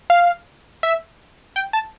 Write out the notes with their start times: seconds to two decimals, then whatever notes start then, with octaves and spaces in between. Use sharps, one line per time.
0.10 F5
0.83 E5
1.56 G5
1.73 A5